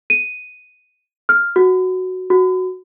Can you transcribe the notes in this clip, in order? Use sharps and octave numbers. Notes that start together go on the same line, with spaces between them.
D#7
F6
F#4
F#4